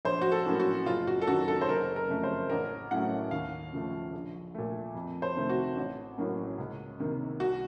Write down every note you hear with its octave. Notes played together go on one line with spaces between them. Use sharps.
A#1 C5
F#4
A4
A2 F#3 A#3 C#4
F#4
F#1 F4
F#4
A4
F#2 D#3 F#3 F#4
A4
C5
F#1 A#4
A#4
F2 C#3 A3
C5
A1 A#4
A2 F#3 A3 C#4 F#5
D#2 F5
C#3 F3 A3
A#1
A#2 A3
F2
C5
C3 D#3 A3 C4
F#4
A1
A2 F#3 A#3 C#4
C#2
C3 D#3 A#3
C2 F#4